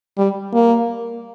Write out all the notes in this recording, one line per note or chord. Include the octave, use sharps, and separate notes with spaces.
G3
A#3